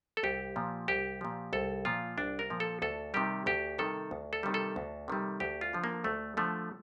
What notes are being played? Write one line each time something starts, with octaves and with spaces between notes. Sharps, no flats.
A4
C2 G4
A#2 F3
C2 G4
A#2 F3
C2 A4
A#2 F3 F4
C2 D4
A#4
A#2 F3
A4
D2 A4
C3 D#3 G3 G4
D2 G4
C3 D#3 G3 A4
D2
A4
C3 D#3 G3
A4
D2
C3 D#3 G3
D2 G4
F4
D3 F3
A#3
D2 A3
D3 F3 A3